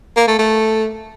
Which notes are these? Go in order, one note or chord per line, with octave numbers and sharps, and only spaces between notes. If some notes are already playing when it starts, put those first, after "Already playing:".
A#3
A3
A3